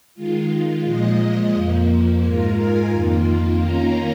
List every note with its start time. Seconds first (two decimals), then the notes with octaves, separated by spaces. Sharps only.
0.14 D#3 G#3 F4
0.83 A#2 F3 G#3 D#5
1.53 F2 F3 A#3
2.23 G#2 G#3 F4 A#4
2.57 G#5
2.92 F2 D#3 A#3 F4
3.61 D#3 A#3 C#4 F4 A#5